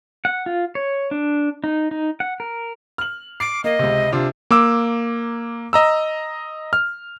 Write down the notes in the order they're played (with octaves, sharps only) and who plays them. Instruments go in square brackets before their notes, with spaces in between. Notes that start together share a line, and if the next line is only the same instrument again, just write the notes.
[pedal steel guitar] F#5
F4
C#5
D4
D#4
D#4
F#5
A#4
[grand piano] F6 F#7
[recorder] D6 [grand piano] C7
[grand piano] A#3 [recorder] D#5
[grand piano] C#2 C3
C3 D4 F4
[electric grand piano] A#3 D6 E6
D#5 A#5 E6
F6